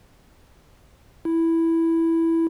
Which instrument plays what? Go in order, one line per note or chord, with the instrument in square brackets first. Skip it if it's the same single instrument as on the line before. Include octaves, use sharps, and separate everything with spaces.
[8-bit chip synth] E4